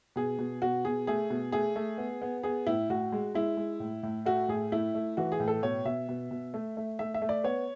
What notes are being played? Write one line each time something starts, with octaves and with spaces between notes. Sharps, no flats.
B2 G#4
B2
B2 F#4
B2 G#4
A3 G#4
B2
A3 G#4
A3
B3
B3
B3 G#4
A2 E4
A2 F#4
G#3
G#3 E4
G#3
A2
A2
A3 F#4
A2 G#4
A3 E4
A3
E3 F#4
G#4
A2
A4
B2 C#5
B2 E5
B2
B2
A3
A3
A3 E5
E5
A3
D5
B3 C#5